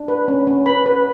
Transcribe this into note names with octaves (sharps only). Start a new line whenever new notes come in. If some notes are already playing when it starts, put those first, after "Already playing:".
Already playing: D4
B4
C#4
C#4
B4 B5
B4